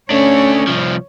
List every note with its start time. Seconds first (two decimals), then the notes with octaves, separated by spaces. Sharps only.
0.10 A3 C#4 D4 C#5
0.67 C2 F3